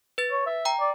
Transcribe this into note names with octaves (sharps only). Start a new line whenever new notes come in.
B4 A6
C#5
E5
G5 A#5
D5